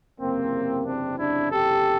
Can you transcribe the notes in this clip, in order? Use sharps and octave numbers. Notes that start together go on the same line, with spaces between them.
F#1 E2 C3 A#3 C4
C4 D4
D4 E4
G4 A4